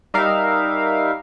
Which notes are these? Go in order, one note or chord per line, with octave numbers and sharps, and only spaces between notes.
G3 D#4 A#4 E5 F5